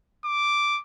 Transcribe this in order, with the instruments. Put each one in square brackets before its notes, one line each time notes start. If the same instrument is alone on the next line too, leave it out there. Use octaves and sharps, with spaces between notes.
[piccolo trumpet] D6